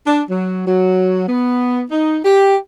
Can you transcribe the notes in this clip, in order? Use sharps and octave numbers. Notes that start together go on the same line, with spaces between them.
D4
F#3
F#3
B3
D#4
G4